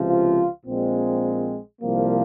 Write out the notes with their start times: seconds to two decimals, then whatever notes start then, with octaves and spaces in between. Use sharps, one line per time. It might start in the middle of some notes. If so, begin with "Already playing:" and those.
Already playing: C#2 C3 F3
0.09 F4
0.66 A#1 A#2 G#3 C4
1.81 C2 C3 F3 A#3